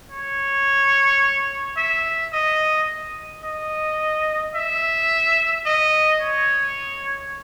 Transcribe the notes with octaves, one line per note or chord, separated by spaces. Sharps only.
C#5
E5
D#5
D#5
E5
D#5
C#5